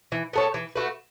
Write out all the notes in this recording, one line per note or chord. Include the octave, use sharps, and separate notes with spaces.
E3
B3 A4 C#5
E3
A3 F#4 B4